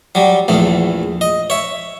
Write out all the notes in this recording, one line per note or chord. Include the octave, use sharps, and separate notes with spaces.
F#3 G3
A#1 E2 A3
D#5
C#5 E5